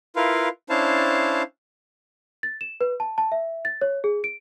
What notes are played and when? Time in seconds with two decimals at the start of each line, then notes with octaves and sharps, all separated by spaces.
0.16 E4 F4 A#4 B4 F5
0.70 C#4 D4 E4 C5 F5 A5
2.43 A6
2.61 E7
2.81 B4
3.00 A5
3.18 A5
3.32 E5
3.65 A6
3.81 C#5
4.04 G#4
4.24 D7